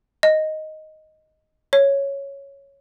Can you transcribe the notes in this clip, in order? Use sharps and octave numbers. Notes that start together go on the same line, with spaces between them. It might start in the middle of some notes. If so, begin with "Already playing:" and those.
D#5
C#5